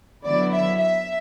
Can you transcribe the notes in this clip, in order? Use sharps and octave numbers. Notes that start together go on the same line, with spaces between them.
D3 F#3 B3 E4 D5
E5
E5